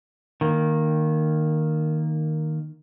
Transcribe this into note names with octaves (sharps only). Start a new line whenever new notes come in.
D#3 A#3